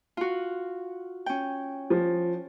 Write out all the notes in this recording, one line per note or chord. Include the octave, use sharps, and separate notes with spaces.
F4 F#4
C#4 G5
F3